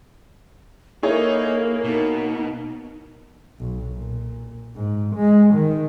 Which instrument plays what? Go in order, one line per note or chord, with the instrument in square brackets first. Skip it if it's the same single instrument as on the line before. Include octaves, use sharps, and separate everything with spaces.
[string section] A#3 [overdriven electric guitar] D#4 [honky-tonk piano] E4 G#4 C#5 [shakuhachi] A4
[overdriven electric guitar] B2 [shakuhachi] D#4
[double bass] B1
A#2
G#2
G#3
D#3